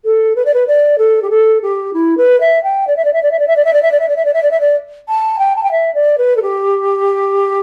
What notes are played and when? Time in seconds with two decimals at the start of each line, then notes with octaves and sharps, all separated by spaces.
0.05 A4
0.36 B4
0.45 D5
0.53 B4
0.67 D5
0.98 A4
1.22 G4
1.30 A4
1.62 G4
1.93 E4
2.17 B4
2.40 E5
2.63 G5
2.87 D5
2.96 E5
3.04 D5
3.13 E5
3.22 D5
3.31 E5
3.39 D5
3.47 E5
3.56 D5
3.64 E5
3.73 D5
3.82 E5
3.91 D5
3.99 E5
4.08 D5
4.16 E5
4.25 D5
4.33 E5
4.42 D5
4.51 E5
4.60 D5
5.08 A5
5.39 G5
5.56 A5
5.63 G5
5.71 E5
5.94 D5
6.18 B4
6.36 A4
6.42 G4